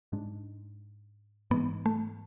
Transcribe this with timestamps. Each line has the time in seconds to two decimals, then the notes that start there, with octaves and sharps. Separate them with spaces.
0.12 G#2 G#3 D4
1.51 G#2 E3 G#3 B3
1.86 A3